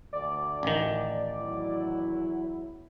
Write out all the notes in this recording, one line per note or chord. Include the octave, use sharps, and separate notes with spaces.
D2 D5
A1 D#3
E2 F#3 E4